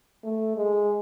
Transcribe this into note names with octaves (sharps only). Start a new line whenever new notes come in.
A3
G#3